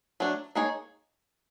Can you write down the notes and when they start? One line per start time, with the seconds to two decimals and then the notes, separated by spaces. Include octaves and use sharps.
0.20 F#3 A3 D4
0.55 A#3 D#4 G#4 C#5